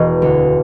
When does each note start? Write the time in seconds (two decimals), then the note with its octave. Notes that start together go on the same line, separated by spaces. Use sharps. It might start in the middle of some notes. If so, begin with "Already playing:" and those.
Already playing: E1
0.22 D2